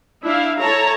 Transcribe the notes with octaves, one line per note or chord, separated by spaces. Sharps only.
D4 E4 E5 F5
E4 A4 C#5 A5 A#5